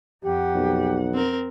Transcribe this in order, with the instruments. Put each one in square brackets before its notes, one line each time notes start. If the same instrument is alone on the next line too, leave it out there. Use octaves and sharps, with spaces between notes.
[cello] F2 F#5 [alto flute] G4
[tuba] B1
[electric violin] C4 A#4